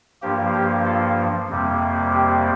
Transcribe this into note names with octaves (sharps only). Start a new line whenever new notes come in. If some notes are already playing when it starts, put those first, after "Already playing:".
G2 F3 A#3 G4
G4
F4 A4
F2 C3 G3 A#3
G4